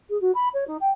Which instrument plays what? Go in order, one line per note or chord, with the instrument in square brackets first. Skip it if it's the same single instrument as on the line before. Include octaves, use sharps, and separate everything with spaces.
[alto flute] G#4
F#4
B5
C#5
D#4
G5